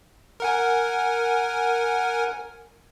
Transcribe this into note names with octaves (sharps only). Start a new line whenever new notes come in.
A#4 F#5 G#5